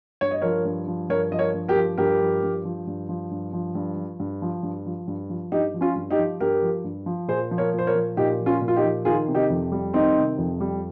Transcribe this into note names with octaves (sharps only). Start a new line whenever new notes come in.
G2 C#5
D#5
F3 A#4 C#5
G2
F3
G2 A#4 C#5
F3 D#5
A#4 C#5
G2
G4 A#4
F3
G2 G4 A#4
F3
G2
F3
G2
F3
G2
F3
G2
F3
G2
F3
G2
F3
G2
F3
G2 D#4 G4
F3
C#4 F4
G2
D#4 G4
F3
G2 G4 A#4
F3
G2
F3
A#2 G#4 C5
F3
A#4 C#5
A#2 C5
A#4 C#5
F3
A#2 D#4 G4
F3
C#4 F4
A#2
F4
D#4 G4
F3
D#3 F4 G#4
C3
D#4 G4
F2
G3
D#3 C4 D#4
C3
F2
G3